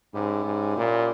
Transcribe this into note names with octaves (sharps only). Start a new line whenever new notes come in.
G#2 C#4 E4 G4
G#2
A#2